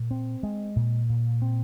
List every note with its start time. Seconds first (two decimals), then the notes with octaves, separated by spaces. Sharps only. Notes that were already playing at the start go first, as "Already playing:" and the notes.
Already playing: A#2
0.11 C4
0.43 G#3
0.76 A#2
1.09 A#2
1.42 C4